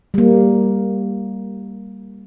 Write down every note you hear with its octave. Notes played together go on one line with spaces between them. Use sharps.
G3 A#3